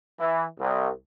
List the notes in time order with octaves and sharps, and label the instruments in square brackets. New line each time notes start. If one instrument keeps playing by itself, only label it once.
[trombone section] E3
C2